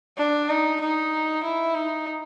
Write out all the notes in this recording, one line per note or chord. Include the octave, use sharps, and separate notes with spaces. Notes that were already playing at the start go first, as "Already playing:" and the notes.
D4
D#4
D#4
E4
D#4